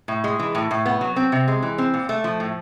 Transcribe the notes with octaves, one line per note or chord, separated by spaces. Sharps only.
A2
G#3
E3
A2
A2
B3
F#3
C4
C3
G#3
E3
C4
A#2
A3
F3
A2